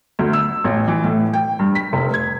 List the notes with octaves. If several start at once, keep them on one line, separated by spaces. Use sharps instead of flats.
D2
E6
A1
E3
A2
G5
G2
B6
F1
G#6